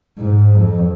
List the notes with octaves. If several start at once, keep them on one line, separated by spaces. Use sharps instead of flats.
G#2
F2